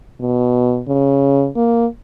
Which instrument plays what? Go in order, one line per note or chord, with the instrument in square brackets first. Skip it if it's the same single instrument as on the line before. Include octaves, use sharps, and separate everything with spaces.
[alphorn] B2
C#3
A#3